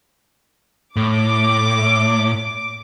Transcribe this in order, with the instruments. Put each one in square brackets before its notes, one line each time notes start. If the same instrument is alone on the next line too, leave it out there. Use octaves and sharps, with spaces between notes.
[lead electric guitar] A2 [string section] D6